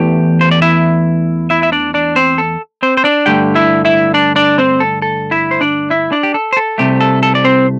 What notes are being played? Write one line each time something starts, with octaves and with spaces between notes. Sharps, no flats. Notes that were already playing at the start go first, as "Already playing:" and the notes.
Already playing: E2 E3 A3 G4
C5
D5
E4 E5
E4 E5
E5
D4 D5
D4 D5
C4 C5
A4
C4 C5
C5
D4 D5
G2 D3 A3 G4 G5
E4 E5
E4 E5
D4 D5
D4 D5
C4 C5
A4
A4
E4 E5
C5
D4 D5
E4 E5
D4 D5
G4
A4
C5
A4
C2 C3 A3 G4
A4
A4
D5
C4 C5